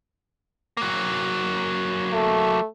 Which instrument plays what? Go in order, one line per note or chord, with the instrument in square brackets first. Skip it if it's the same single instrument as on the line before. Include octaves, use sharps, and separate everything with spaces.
[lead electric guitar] F#3 A#3
[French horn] A3